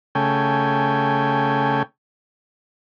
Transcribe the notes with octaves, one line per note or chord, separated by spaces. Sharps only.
C#3 A3 G5 G#5